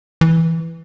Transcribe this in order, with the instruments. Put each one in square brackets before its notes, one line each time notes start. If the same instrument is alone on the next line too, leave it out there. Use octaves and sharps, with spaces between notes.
[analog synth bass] E3